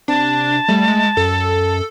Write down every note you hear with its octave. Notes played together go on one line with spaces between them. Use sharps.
C3 D4 A5
G3 A3
G#3
F#2 A4